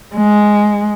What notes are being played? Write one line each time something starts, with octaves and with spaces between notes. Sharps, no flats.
G#3